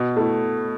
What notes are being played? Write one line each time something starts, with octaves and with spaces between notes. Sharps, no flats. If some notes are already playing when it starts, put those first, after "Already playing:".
Already playing: B2
A3 E4